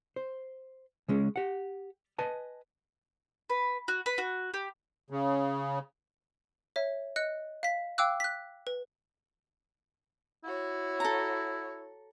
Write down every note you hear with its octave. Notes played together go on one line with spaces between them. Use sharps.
C5
C#3 G#3 C#4
G4 F#5
B4 D#5 G#5 A5
B4
F#4
B4
F#4
G4
C#3
C#5 E5
D#5 F#6 C#7
F5 B6
F5 G5 D6 E6 F#6
F#6 B6
B4
E4 F#4 C#5
A4 A#5